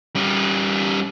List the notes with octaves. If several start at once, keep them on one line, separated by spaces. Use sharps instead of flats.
G3 C#4